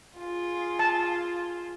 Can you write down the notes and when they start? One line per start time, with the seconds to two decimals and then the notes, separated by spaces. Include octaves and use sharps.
0.17 F4 G#4
0.79 A5